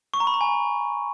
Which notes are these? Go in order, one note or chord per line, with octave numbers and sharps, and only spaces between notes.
C#6
A#5
B5
A#5
G#5